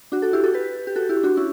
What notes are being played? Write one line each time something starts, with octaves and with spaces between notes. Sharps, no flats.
D4 F#4
F#4 A4
E4 G4
F#4 A4
G4 B4
G4
F#4 A4
E4 G4
D4 F#4
C#4 E4